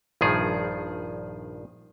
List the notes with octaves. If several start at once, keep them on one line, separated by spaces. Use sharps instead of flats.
A#1 G2 D#3 F3 G#4